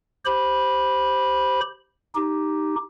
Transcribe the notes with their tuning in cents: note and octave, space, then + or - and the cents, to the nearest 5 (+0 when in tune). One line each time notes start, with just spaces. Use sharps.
G4 +0 C5 +0 B5 -10
D#4 +0 G4 +0